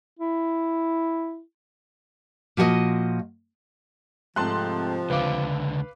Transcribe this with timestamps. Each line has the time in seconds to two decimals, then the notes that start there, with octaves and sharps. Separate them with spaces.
0.19 E4
2.57 A#2 F3 F#4 A#4 D#5
4.36 G#2 C3 F3 A3 C4 A5 C6 F#6
5.10 C#2 D3 B4 F5 D6